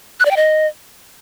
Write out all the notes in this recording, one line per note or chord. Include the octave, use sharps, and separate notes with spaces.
F#6
D5
G5
D#5